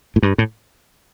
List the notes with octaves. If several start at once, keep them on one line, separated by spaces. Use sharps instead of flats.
A2
G2
A2